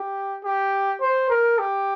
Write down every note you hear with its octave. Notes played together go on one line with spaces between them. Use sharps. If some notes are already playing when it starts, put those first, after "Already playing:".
Already playing: G4
G4
C5
A#4
G4